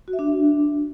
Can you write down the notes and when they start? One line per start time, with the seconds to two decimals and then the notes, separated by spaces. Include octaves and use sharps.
0.08 F#4
0.13 E5
0.19 D4